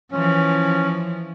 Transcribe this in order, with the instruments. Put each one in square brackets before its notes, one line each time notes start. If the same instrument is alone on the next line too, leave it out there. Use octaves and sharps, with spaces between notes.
[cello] E3 F3 [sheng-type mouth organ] C#4